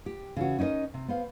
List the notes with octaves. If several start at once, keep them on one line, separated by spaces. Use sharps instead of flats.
G4
C#3 E3 C#4 F#4
C#4 D#4 E4 A#4 D#5
C3
B3 C5 F5